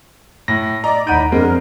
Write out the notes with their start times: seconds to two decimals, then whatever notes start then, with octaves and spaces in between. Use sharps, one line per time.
0.48 A2 A#6
0.84 D5 D#5 A#5
1.07 D#2 A2 D#4 F#5 B5 G6 D7 D#7
1.32 F2 D3 G#3 C4 A#4